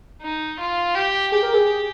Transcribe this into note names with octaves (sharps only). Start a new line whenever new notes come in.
D#4
F4
G4
G4 G#4
A#4
G#4